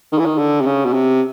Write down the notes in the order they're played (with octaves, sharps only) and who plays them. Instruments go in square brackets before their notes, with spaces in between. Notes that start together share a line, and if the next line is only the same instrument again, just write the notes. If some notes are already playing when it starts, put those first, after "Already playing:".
[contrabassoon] D#3
E3
D#3
D3
C3
C#3
B2
C3